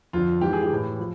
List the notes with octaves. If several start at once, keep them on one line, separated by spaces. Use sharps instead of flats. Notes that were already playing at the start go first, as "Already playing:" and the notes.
F2 D3 F3 F4
G#2 E3 G4
G#4
G4
A2 E3
F3